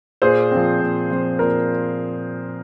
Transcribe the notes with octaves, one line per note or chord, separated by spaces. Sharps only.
A#2 G#4 C5
F3 C4
A#2
F3 C4
A#2 A#4